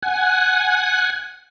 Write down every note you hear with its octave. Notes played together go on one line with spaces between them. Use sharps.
F#5 G#5